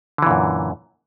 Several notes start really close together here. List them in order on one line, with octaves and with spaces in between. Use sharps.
D3 E3 A#2 F#2